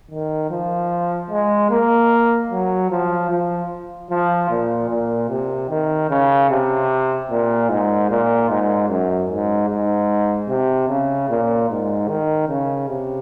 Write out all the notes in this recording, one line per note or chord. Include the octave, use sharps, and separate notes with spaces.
D#3
F3
G#3
A#3
F#3
F3
F3
F3
A#2
A#2
C3
D#3
C#3
C3
A#2
G#2
A#2
G#2
F#2
G#2
G#2
C3
C#3
A#2
G#2
D#3
C#3
C3